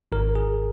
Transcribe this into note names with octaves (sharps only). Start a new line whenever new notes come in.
G#1 A#4
G#4